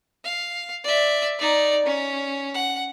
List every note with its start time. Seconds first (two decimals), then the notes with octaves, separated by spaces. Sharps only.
0.24 F5
0.84 D5 E5
1.39 D#4 D5
1.86 C#4
2.54 F#5